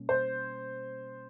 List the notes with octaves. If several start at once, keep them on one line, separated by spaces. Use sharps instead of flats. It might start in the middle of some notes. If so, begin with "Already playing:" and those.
Already playing: B2 G3 A#3 C#4
C5